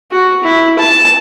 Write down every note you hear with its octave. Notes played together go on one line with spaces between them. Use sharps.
F#4
E4
A5